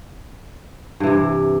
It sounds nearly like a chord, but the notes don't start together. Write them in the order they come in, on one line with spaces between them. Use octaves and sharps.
G2 E3 C3